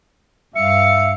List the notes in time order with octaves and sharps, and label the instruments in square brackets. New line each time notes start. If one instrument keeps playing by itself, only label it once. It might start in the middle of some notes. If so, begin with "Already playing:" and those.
[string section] G2 F5 [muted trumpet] E5 [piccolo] C#7